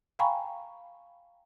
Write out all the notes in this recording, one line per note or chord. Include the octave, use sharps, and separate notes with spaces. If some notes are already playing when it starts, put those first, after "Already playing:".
F5 G5 G#5 A#5 B5 C#6